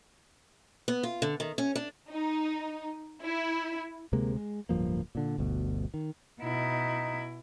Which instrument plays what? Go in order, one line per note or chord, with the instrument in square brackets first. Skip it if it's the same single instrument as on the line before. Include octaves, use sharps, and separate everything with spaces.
[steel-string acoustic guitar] B3
F4
D3
D#3
C#4
D4
[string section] D#4
E4
[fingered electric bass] D2 C3 G#3 A#3
G#3
D1 G2 F3 A#3
A#2 D3
G1 D2 B2
D#3
[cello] B2 E4 [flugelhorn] D#4